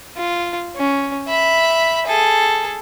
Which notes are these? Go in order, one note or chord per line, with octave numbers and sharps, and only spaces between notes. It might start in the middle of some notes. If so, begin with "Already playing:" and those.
F4
C#4
E5 B5
G#4 A4